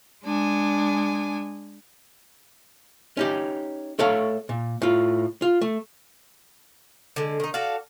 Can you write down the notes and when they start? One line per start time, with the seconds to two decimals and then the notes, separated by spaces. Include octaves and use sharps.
0.24 G#3 D4 G#5
3.17 C#4 D#4 G4
3.99 A3 A4 C#5 F5
4.49 A#2
4.82 A2 F4
5.42 F4
5.62 A3
7.16 D3 G#3
7.40 D#3 D#4
7.54 F#4 A4 D5 F5